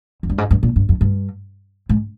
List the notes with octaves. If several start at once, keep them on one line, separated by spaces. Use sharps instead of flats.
F2
G2
G#2
G2
A#2
G2
F2
G2
G#2